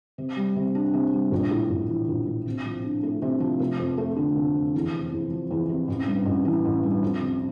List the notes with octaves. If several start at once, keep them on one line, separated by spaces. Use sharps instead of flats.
C3
G3
C3
D4
C3
G3
A#1
A2
A#1
E3
A#1
A2
C3
F3
D4
A3
C3
F3
F1
F2
A3
D3
F1
F2
E2
C3
E2
F3
E2
C3
A1
G2
A1
E3
A1
G2
F2
C3